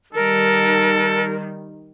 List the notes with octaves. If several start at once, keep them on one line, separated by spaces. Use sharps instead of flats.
D#3 G3 A4 A#4